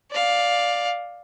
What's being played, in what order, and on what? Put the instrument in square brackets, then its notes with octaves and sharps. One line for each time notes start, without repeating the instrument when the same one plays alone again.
[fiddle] D5 F5